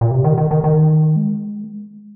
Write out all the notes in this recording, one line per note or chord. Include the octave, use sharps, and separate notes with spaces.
A#2
C3
D#3
D#3
D#3
D#3
G#3